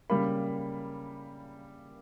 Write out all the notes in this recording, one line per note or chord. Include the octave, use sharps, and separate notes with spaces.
C#3 G3 A#3 B5